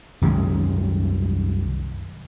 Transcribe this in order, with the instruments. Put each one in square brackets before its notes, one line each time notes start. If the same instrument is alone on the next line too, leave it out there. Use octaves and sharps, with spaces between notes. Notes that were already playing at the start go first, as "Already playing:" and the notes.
[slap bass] C2 F#2 D#3 G#3